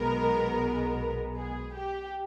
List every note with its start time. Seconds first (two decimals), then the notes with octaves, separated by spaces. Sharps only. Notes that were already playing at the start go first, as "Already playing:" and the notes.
Already playing: B1 B2 G#3 B3 A#4
1.37 G#4
1.75 G4